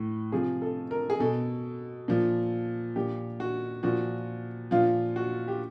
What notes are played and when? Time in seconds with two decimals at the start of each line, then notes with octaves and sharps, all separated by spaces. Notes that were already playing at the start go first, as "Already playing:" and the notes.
Already playing: A2 E3
0.32 C3 F3 G#4
0.62 A4
0.91 A#4
1.10 G#4
1.20 B2 A4
2.08 A#2 F3
2.96 A#2 F3 G4
3.40 F#4
3.83 A#2 F3 F#4
4.71 A#2 F3 F4
5.16 F#4
5.48 G4